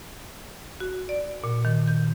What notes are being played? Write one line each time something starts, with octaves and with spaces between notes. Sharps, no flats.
F#4
D5
A#2
D#3
G6